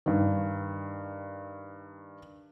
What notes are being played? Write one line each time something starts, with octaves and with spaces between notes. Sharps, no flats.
G2 D#3